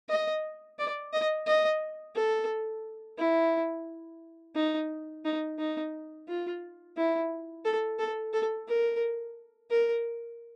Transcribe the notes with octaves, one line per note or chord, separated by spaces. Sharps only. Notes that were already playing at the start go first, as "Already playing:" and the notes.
D#5
D5
D#5
D#5
A4
E4
D#4
D#4
D#4
F4
E4
A4
A4
A4
A#4
A#4